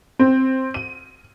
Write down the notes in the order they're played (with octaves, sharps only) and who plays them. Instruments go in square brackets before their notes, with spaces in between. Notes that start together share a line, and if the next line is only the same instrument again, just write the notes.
[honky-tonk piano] C4
D#7